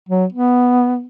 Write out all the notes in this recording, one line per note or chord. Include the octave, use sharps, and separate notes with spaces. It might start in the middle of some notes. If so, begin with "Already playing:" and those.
F#3
B3